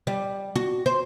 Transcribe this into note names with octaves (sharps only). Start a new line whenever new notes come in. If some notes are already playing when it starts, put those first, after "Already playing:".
G3
F#4
C5